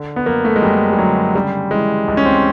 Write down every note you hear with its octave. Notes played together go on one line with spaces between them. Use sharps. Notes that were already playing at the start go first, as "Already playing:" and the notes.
Already playing: D3
B3
F#2 A#3
A3
G#3
F#2 G3
G3
D3 F#3
C#3 G3
E3 G#3
C#2
C#4
C4